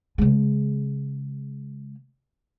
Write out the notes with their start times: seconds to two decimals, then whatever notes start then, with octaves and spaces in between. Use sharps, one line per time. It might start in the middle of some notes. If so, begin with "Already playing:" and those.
0.18 C#3 G#3